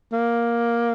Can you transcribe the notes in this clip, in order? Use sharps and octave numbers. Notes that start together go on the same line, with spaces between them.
A#3